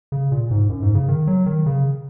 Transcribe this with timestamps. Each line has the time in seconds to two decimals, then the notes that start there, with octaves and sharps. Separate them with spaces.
0.12 C#3
0.32 A#2
0.51 G#2
0.69 F#2
0.82 G#2
0.95 C#3
1.08 D#3
1.27 F#3
1.46 D#3
1.66 C#3